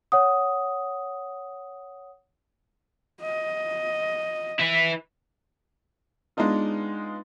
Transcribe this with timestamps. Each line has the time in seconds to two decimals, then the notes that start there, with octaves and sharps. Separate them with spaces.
0.12 C#5 F#5 D#6
3.23 D#5
4.59 E4 B4
6.37 G#3 B3 D4 D#4 F4